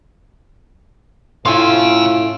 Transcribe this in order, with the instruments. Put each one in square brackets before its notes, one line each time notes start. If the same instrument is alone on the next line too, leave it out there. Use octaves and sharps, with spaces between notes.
[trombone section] A2 [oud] C#4 E4 F4 [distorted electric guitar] F5 G#5 [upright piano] C6